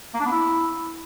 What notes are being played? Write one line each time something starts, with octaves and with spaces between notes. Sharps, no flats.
A#3
D4
B3
E4